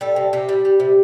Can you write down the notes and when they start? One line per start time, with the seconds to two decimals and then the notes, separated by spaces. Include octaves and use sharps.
0.01 G3 A4
0.16 C3
0.33 C3 G4
0.49 G3
0.65 G3
0.80 C3